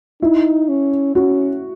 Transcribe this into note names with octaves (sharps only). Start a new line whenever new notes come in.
D#4 E4
C#4
C#4 F#4